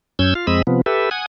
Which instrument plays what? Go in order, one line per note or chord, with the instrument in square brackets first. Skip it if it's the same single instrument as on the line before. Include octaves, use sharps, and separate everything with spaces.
[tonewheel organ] F#2 C#4 E6 G6 G#6
F4 F5
F2 G#3 C4 D#5 B5 E6
C3 F3 B3
G4 A4 B4 E5
F#5 G#5 D#6